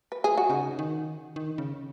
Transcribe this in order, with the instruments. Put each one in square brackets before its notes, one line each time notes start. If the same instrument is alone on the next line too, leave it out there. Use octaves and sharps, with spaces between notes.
[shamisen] B4
G#4
F#4
[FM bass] C#3 [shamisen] D#4
[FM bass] D#3
D#3
C#3